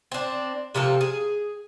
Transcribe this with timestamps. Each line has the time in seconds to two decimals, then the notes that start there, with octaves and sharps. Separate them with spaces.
0.12 C4 D4
0.75 C3 F3 A#3 A4
1.01 G#4